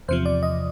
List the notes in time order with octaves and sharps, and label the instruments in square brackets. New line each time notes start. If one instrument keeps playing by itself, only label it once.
[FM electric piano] E2 C3 F3 C5
D5
D#5